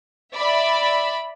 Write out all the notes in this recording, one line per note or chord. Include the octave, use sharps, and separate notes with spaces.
D5 E5 B5